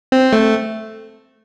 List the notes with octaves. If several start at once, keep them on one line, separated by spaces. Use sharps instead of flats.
C4
A3